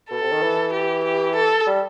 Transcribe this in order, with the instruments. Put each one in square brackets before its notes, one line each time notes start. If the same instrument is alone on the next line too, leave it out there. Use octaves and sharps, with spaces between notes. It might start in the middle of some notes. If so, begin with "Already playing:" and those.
[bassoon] B2 [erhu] A4
[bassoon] C3
D#3
E3
[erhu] G4
G4
A4
[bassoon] G3